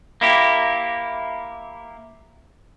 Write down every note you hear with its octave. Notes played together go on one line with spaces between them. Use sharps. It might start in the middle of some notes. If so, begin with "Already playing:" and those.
A#3 E4 G4